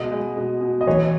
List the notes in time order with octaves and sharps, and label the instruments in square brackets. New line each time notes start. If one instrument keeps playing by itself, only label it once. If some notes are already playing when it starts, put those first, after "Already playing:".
Already playing: [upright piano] B2 G#3 [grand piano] D#5
[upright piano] G#3
B2
B2
[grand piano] D#5
[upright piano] E3 [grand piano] C#5